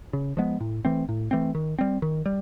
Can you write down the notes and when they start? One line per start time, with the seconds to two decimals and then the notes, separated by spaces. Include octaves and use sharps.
0.13 C#3
0.37 F3 G#3 B3
0.61 A2
0.85 E3 A3 C4
1.09 A2
1.31 E3 A3 C4
1.55 D#3
1.79 G3 C4
2.02 D#3
2.26 G3